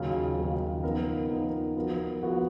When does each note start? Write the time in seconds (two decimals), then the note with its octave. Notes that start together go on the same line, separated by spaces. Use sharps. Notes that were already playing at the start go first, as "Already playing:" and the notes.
Already playing: D#2 C#3 F#3 C#4 F4
0.37 D#2 C#3 F#3 C#4 F4
0.83 F3 B3 D#4 A#4
1.29 F3 B3 D#4 A#4
1.76 F3 B3 F#4 A#4
2.21 F3 B3 F#4 A#4